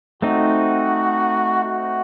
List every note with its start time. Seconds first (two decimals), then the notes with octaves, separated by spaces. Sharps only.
0.22 A3 C4 D#4 F#4
1.65 F#4